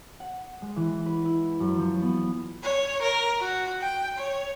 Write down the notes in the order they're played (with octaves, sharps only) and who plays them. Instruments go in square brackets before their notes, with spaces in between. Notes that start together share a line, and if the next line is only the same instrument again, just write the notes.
[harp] F#5
G#3
E3
B4
E4
F#2
F3
B3
[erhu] C#5
A#4
F#4
G5
C#5